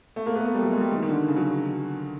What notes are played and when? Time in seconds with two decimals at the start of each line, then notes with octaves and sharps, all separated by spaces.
0.16 A3
0.26 A#3
0.35 B3
0.45 A3
0.54 G3
0.63 F#3
0.72 G#3
0.81 G3
0.91 D#3
1.03 D#3
1.09 D3
1.28 C#3
1.36 F#3